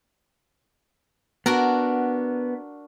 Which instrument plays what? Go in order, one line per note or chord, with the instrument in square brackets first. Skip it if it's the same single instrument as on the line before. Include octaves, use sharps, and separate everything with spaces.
[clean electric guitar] B3 [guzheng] D4 F#4 A#4